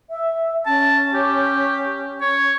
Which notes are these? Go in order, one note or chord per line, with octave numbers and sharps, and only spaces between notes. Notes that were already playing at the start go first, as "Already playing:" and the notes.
E5
C#4 A5
G4
C#5